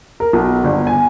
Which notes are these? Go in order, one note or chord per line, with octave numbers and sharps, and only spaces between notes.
A#4
B1
G1
G#5